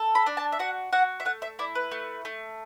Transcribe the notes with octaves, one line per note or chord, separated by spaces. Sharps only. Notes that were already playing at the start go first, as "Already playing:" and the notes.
Already playing: A4
B5
D4
A5
E5
F#4 F#5
F#4 F#5
E5
A3 F#5
E5
E4 D5
B4
A3
A3